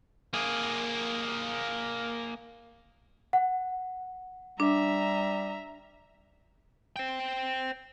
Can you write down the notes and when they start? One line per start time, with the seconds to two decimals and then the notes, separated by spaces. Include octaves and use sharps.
0.33 A#3 G#4
3.33 F#5
4.60 G3 D4 E5 A#5
6.96 C5 G5